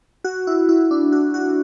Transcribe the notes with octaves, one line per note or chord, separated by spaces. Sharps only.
F#4
E4
E4
D4
F#4
F#4